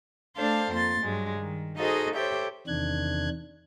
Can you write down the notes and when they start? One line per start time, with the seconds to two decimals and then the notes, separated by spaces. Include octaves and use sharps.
0.36 A3 D4 A4 C5 F5 A5
0.71 F2 A#3 C6 A6
1.02 G2 F#3 G#3
1.40 D#3
1.77 D#4 F#4 G#4 A4 C5 D#5
2.14 G4 A4 C5 C#5 E5 G5
2.67 E2 C3 D#3 D4 F#6 G#6